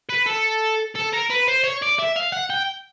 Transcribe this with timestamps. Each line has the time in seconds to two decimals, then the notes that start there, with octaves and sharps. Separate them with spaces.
0.09 B4
0.26 A4
0.95 A4
1.13 A#4
1.30 B4
1.48 C5
1.64 C#5
1.82 D5
1.99 E5
2.16 F5
2.32 F#5
2.50 G5